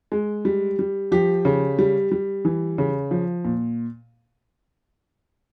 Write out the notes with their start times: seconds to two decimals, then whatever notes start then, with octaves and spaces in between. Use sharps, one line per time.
0.12 G#3
0.45 G3
0.79 G3
1.12 F3 G4
1.45 C#3
1.79 G3
2.11 G3
2.45 E3
2.78 C#3
3.11 F3
3.45 A#2